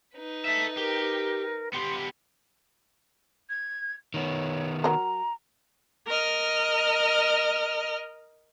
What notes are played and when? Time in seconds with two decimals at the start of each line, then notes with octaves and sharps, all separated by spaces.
0.15 D#4 B4
0.45 A4 E5 B6
0.77 G4 A#4
1.73 B3 G4 C6
3.49 G#6
4.14 D#3 B3 C#5
4.84 F#3 A#4 A#5
6.08 A#4 D#5 F6